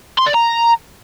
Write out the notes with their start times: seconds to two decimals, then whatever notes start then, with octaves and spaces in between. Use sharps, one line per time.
0.18 C6
0.26 D5
0.34 A#5